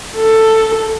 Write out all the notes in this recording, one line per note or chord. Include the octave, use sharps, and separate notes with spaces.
A4